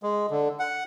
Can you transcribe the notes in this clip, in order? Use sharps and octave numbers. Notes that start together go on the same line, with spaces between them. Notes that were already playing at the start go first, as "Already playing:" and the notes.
G#3
D3
F#5